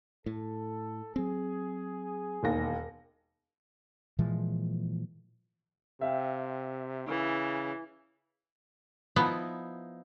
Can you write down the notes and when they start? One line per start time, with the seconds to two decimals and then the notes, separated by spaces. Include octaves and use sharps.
0.26 A2 A4
1.16 F#3 C4 G#4
2.43 E1 D#2 A#6
4.19 A#2 E3 F3 G#3
6.01 C3 E5 F5 G5
7.08 C#3 E3
9.16 F3 B3 D#4 E4